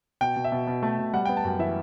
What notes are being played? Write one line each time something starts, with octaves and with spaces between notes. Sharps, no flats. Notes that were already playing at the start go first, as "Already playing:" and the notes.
B2 G5
B2
E5
B2
B2
A3
B2
G3 F#5
B3 G5
A5
F#2 G5
E3 E5